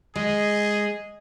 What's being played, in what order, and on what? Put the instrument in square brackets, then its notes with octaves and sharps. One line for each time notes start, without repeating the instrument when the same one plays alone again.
[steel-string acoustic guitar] G#3 [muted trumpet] G#4 [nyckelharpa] D#5